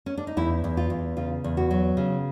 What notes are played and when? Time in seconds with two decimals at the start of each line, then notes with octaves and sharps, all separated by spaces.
0.06 C#4
0.18 D4
0.27 D#4
0.37 E2 E4
0.64 E2
0.77 F4
0.90 E2
1.17 C#3 F4
1.44 E2
1.57 F#4
1.71 F#3
1.97 C#3